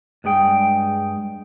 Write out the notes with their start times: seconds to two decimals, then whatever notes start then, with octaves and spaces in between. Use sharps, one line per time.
0.24 G2 G#3 G#4 G5